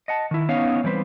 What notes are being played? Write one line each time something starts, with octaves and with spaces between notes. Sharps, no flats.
D#5 F#5 A5
D#3 E4
B3 C#4 D#4 C#5 F5
E3 G3 C4 B4 C5